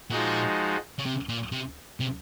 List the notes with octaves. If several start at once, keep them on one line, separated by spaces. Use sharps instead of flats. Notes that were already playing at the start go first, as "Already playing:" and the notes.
A#2 F3 G#3 D#4 F#4
C#3
C3
A#2
C3
C3